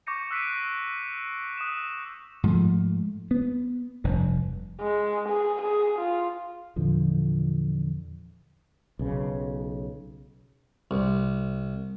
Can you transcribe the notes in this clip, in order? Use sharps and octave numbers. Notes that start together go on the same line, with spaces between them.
C#6 D6 G6 A#6 C#7 D#7
E6 F#6 B6 C7 D7 D#7
D#6 F#6 E7
G#2 F3 A3
B3
F1 G2
G#3
G#4
G#4
F4
E2 A#2 D3 F3
B1 C#3
C2